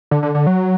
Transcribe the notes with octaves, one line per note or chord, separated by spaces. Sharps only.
D3
D3
D3
F#3